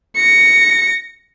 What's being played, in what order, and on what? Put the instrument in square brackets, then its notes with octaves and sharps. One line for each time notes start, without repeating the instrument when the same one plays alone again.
[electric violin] A#6 C#7